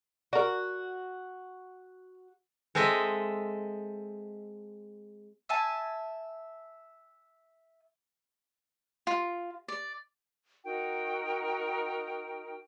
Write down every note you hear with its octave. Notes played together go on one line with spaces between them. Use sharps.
F#4 A#4 D5
G#3 C4 A4 D#5 E5
E5 G#5 A5
F4
D5
D#4 F#4 A#4 G5